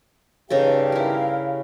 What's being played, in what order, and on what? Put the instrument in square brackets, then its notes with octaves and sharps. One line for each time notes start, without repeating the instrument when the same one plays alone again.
[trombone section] G2 G4 [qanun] C#3 D#4 A4 [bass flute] F5
[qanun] E4 A#4